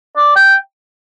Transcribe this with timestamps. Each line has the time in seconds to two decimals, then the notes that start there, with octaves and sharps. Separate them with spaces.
0.17 D5
0.36 G5